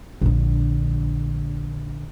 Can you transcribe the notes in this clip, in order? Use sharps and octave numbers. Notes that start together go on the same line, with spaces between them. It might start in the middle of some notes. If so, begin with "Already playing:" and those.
A#1 D3